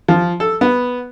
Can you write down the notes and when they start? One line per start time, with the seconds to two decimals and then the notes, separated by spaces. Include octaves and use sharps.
0.08 F3
0.40 A4
0.61 B3